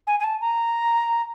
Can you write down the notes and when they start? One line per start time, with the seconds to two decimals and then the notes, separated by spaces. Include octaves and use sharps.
0.07 G#5
0.19 G#5
0.24 A5
0.41 A#5